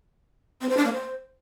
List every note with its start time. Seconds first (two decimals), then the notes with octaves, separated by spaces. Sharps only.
0.61 C4
0.69 C5
0.77 D4
0.85 A#3
0.93 C5